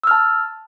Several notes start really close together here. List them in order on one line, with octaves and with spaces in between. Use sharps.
E6 F6 A5